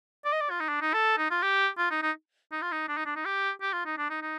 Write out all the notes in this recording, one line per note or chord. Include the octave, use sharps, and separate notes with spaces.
D5
D#5
D5
F4
D#4
D4
D#4
A4
D#4
F4
G4
F4
D#4
D#4
D#4
F4
D#4
D4
D#4
D4
D#4
G4
G4
F4
D#4
D4
D#4
D#4